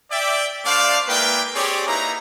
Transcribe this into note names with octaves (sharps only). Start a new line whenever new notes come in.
D5 E5 G5
A3 D4 C5 D5 F5
G#3 A#3 E4 B4 D5 G5
C4 G4 G#4 C#5 D5
A#3 D#4 E4 B4 A#5